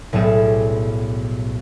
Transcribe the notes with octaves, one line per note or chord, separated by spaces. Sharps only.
B1 A2 G3 G#4 E7